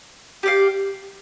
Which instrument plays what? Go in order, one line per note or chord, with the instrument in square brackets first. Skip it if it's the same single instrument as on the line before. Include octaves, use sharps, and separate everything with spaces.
[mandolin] G4 D5 F5